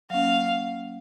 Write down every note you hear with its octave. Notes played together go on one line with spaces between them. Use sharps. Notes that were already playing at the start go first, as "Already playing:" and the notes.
F#3 A#3 C#4 F5